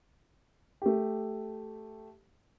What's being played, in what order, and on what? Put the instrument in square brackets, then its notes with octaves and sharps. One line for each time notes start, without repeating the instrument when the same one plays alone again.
[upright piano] A3 G4